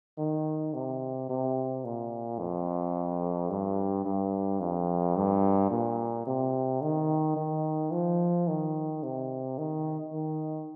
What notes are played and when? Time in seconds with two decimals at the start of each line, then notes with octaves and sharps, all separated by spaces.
0.18 D#3
0.74 C3
1.29 C3
1.84 A#2
2.39 F2
3.50 G2
4.05 G2
4.60 F2
5.16 G2
5.70 A#2
6.27 C3
6.82 D#3
7.36 D#3
7.92 F3
8.48 D#3
9.03 C3
9.58 D#3
10.13 D#3